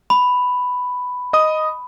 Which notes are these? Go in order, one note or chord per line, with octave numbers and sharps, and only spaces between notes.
B5
D#5 D#6